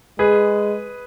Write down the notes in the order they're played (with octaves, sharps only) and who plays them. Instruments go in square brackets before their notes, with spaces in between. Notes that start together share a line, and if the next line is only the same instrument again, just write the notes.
[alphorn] G#3 [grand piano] G#4 B4